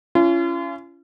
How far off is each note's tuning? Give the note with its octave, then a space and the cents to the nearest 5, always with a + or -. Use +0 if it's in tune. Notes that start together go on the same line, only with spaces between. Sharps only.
C#4 +20 F4 -40